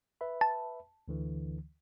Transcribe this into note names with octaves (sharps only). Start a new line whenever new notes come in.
B4 E5 B5
A5
D2 D3 E3